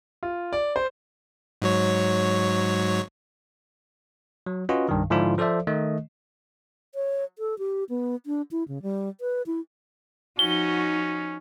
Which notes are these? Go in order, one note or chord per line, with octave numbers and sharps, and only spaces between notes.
F4
D5
C5
G#2 F#3 C#5
F#3
C#4 F4 F#4 B4 D#5
C2 G2 D#3
G#2 D3 F3 D4 E4 F4
F3 A4 C5 D5 E5
D#3 A3 D#5
C#5
A4
G4
B3
D4
E4
C#3
G3
B4
E4
F3 C#4 D#4 F#4 G7